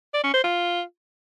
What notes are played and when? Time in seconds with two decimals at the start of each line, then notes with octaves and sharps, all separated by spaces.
0.14 D5
0.24 C#4
0.34 C5
0.44 F4